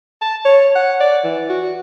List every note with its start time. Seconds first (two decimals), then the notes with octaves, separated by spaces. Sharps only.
0.21 A5
0.45 C#5
0.75 F#5
1.00 D5
1.24 E3
1.49 F#4